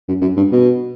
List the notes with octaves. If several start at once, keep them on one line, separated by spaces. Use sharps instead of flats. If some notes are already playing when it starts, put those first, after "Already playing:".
F#2
F#2
G2
B2